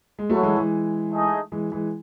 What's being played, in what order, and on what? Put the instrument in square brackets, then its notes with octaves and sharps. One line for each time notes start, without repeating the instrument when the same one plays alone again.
[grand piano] G#3
[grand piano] F#3 A3 [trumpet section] E4 A4 C#5 F#5
[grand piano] E3 G#3
E3 G#3
[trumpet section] A3 D#4 G#4 D#5
[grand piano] E3 G#3
E3 G#3